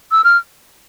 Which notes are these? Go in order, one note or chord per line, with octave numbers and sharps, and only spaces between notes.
E6
F6